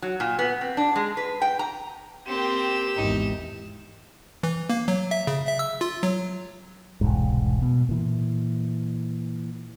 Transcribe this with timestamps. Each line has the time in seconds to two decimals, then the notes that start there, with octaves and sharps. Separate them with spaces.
0.02 F#3
0.20 A#2
0.39 B3
0.61 C4
0.77 D4
0.96 G#3
1.17 B4
1.42 G5
1.59 A#5
2.27 A#3 C4 G4 E7
2.96 G#1 E2 D#4
4.43 E3
4.69 A#3
4.88 F#3
5.11 E5
5.27 C#3
5.47 E5
5.59 E6
5.81 F4
6.03 F#3
7.01 E1 C2 G#2
7.62 B2
7.89 A#2 E3